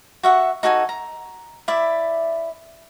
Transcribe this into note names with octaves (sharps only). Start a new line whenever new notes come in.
F#4 E5 F#5
D#4 F#4 A4 G#5
A#5
E4 D5 E5